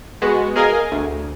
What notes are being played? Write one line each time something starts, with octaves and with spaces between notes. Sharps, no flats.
G#3 B3 F#4
G#4 A#4 D#5 F5 G#5
D2